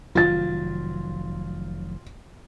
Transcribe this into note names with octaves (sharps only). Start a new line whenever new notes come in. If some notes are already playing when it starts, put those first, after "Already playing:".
F1 D#3 F#3 F4 A6